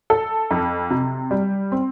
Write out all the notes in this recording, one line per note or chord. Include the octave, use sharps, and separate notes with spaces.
A4
F2
C3
G3
C4